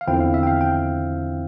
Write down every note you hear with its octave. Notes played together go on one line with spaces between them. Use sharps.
F5
E2 D3 F3 C4 E4 G5
F5
E5
G5
F5
G5